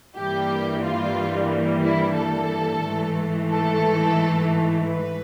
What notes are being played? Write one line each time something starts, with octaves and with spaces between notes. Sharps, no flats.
G2 E3 G3 A#3 G4
F4
E4
A4
G#2 E3 A3
A4
B4